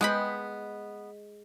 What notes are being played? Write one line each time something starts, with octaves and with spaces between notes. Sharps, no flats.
G#3 B3 G5 B5